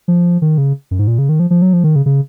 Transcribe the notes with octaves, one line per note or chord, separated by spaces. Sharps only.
F3
D#3
C#3
F#2
G#2
A#2
C#3
D#3
F3
F3
F#3
F3
D#3
C#3
C#3